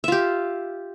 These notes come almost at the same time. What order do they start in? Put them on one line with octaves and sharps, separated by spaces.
E5 F4 G4